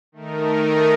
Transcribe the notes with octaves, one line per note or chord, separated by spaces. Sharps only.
D#3 A3 D#4 A#4